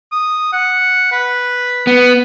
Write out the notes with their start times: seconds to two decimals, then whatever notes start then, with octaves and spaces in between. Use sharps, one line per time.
0.12 D#6
0.53 F#5
1.12 B4
1.87 B3